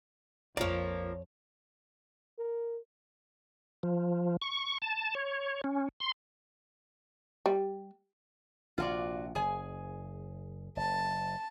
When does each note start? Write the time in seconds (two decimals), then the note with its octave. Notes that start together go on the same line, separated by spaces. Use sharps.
0.57 A#1 F2 F3 A#3 F4 C#5 D5
2.38 A#4
3.83 F3
4.42 C#6
4.82 A5
5.15 C#5
5.64 C#4
6.00 C6
7.46 G3
8.78 A#1 C3 F4 F#4 D5
9.35 F#1 G#4 G#5
10.77 F#1 A5